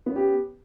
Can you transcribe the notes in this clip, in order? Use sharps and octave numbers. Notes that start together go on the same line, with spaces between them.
B3 C#4 G4